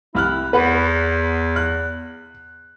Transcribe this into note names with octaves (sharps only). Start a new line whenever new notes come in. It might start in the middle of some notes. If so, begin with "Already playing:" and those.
C2 E4 F6 F#6
E2 B4 F#5 B5
F#6